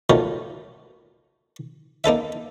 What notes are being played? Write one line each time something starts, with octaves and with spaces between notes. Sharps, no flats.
D#3 F3 F#3 A3
A#3 D#4 A4 E5